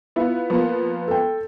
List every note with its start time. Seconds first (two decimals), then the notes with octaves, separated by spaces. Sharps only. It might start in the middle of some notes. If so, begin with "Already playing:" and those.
0.16 B3 E4 F4
0.50 F3 A#3 B3
1.08 A4 G5